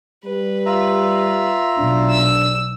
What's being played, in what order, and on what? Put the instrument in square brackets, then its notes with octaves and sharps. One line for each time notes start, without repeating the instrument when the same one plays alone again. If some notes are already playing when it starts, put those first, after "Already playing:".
[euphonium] G3 [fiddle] B4
[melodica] F4 E5 A#5
[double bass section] B1 [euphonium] D4
[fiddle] E6